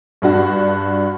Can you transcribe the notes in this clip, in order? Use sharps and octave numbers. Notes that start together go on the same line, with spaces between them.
G2 D4 F#4